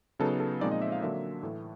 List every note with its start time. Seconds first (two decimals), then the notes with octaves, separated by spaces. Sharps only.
0.19 C#3 F#3 B3 D#4 A4
0.40 A4
0.61 A#2 F3 G#3 C4 D#4 D5
0.72 D#5
0.82 E5
0.92 F5
1.02 D3 F#3 A#3 D4 E5
1.43 A2 E3 A3